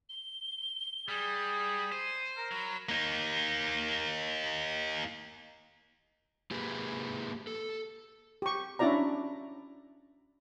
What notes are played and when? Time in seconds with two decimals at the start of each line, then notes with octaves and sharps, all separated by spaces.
0.09 G7
1.08 G3 G#4
1.92 C5 D#7
2.37 A#4 A#5
2.52 F#3 B5
2.89 A#3 D#4
6.51 A#3 G4 G#4 B4
7.47 A4
8.42 G4 C#6
8.79 C#4 D4 E4 F#4 D5 A#5